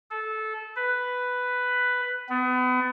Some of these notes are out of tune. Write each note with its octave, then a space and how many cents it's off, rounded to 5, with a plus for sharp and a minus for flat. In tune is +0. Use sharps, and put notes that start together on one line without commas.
A4 -15
B4 +5
B3 +35